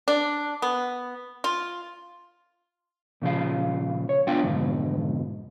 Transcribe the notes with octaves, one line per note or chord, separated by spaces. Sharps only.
D4
B3
F4
A#2 C#3 F3 F5
C#5
B3 D4 F4 F5 G5
F2 G#2 B2 D3